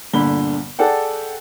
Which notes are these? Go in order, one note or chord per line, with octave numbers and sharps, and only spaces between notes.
G1 A#2 D3 B5 G7
G#4 A4 D5 F#5 G5